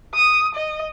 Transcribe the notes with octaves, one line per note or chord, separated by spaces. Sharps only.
D#6
D#5